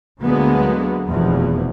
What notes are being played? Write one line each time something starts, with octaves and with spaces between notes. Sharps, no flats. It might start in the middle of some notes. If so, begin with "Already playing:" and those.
D2 D3 F#3 G#3 A#3 B3
F1 E2 B2 F3